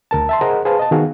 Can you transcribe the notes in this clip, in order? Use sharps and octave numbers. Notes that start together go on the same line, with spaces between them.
D2 A#4 A5
E5 A5 C6
G#4 A#4 C5 D#5 F#5 A#5
G#4 B4 C5 F5 A5
D#5 A5
D#3 B3 F#4 G#4 F5